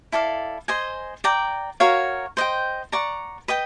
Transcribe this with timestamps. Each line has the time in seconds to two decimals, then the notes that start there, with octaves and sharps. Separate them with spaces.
0.12 E4 A4 D5 F5
0.68 C5 D#5 G#5
1.24 D5 G5 A#5
1.80 F#4 A#4 C#5 F5
2.37 C5 D#5 G5
2.92 D5 F#5 A#5 C#6
3.48 B4 D#5 G5